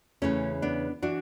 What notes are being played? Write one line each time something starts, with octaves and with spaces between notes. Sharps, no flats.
E2 C#3 E3 A3 C#4
B3 D4
E3 D4 F#4